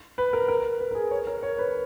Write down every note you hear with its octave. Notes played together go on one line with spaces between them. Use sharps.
B4
A#4
A#4
B4
A#4
G#4
C#5
A#4
C#5
B4